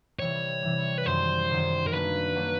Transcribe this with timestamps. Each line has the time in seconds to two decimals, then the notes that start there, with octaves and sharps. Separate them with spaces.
0.19 C3 E3 G3 C#5
0.63 C3 E3 G3
0.98 B4
1.06 F#2 D#3 G3 C5
1.49 F#2 D#3 G3
1.87 A#4
1.92 F#3 A#3 D4 B4
2.36 F#3 A#3 D4